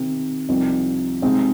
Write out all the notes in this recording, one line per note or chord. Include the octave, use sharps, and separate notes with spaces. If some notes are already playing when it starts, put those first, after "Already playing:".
Already playing: C3 D#3 C4
C2 C3 F3 C4 D#4
C3 G#3 C4 D#4